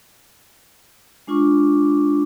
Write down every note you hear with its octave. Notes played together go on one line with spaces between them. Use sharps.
G#3 D4 F4 C#6 D6